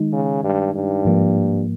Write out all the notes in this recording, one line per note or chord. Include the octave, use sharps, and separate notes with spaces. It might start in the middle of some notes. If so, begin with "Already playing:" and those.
Already playing: D#3 G#3 D#4
C#3
G2
G2
G#2 F3 A#3